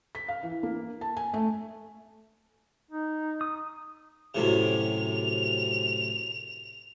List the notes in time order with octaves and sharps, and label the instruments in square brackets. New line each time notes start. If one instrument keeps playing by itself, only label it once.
[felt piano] B6
F5
E3
A#3
A5
G#5
A3
[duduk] D#4
[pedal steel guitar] D#6
[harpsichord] F#2 A2 C3 [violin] F7